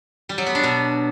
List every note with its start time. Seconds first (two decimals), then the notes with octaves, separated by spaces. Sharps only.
0.29 G3
0.38 F#3
0.46 B3
0.55 D4
0.63 B2